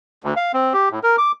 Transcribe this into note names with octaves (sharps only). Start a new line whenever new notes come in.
D2
F5
C4
G4
A2
A#4
D6